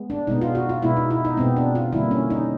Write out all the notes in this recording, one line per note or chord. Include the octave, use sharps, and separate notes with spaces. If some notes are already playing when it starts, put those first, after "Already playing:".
Already playing: G#3 B3
D4
B2 G#3 B3 D#4
F4
F#4
F4
B2 G#3 B3 E4
D#4
E4
D#4
B2 G#3 B3 C4
D4
F4
D3 G3 A#3 E4
C#4
D#4